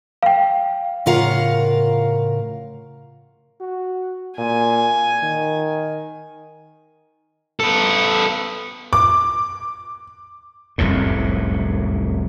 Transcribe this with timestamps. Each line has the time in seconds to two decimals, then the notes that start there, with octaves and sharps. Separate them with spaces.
0.23 F5 G5
1.06 A2 C#3 F4 A#4 F5 F#5
3.61 F#4
4.38 A#2 G#5
5.23 D#3
7.60 B3 A4
8.93 D6
10.78 F1 C2 F#2 A2